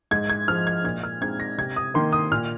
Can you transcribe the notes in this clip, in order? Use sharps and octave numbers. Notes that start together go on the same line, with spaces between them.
G#2 G#6
G#6
F3 G#3 F6
G#6
A#2 G#6
F6
G#3 C4 D#4 G#6
A#6
C3 G#6
D#6
D#3 A#3 C6
D#6
A#2 F6